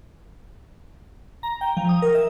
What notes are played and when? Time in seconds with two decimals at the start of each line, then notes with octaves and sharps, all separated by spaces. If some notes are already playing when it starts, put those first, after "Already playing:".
1.43 A#5
1.61 G5
1.77 F3
1.89 D#6
2.02 A#4
2.15 E5